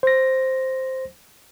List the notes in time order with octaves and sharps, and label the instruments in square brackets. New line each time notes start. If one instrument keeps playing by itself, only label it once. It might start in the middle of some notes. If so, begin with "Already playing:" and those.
[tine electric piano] C5 A#6